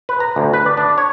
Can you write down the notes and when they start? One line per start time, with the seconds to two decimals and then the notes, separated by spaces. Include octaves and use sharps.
0.09 B4
0.20 A#5
0.36 D2
0.53 B4
0.66 D5
0.77 D4
0.98 C#5